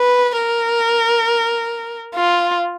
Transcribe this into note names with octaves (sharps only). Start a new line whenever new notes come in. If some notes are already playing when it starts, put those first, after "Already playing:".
Already playing: B4
A#4
F4